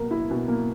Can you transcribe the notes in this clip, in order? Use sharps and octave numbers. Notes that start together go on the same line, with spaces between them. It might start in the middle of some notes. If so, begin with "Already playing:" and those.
Already playing: B2 A#3 A#4
E4
B2
A#3